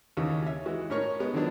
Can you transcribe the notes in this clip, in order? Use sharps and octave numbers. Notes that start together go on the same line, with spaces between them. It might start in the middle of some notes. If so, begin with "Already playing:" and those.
D#2 C#3 E3
C#4 E5
E3 G#3 F#4
A2 C#4 A#4 C#5 C#6
G#3 B3
D3 D#3 F3 F#3 B3 D4